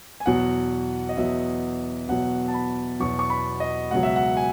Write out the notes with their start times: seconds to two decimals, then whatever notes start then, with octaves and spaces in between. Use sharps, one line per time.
0.20 G#5
0.26 E2 B2 F#3 F#5
1.09 D#5
1.17 E2 B2 F#3 E5
2.08 E2 B2 F#3 F#5
2.48 A5
2.54 B5
3.00 E2 B2 F#3 C#6
3.19 C#6
3.30 B5
3.60 D#5
3.91 C#2 B2 F#3 F#5
4.03 E5
4.16 F#5
4.37 G#5